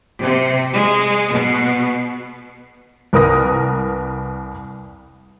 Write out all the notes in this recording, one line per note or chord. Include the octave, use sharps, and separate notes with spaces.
C3
G#3
B2
C2 A#4 B4 D#6 A#6